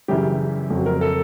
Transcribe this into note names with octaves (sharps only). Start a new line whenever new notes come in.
F#2 C#3 E3 G3 G4
F2 C#3 F#3
A#4
A4